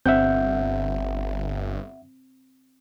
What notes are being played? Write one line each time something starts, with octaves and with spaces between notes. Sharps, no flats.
G1 C4 E5 F#5 G6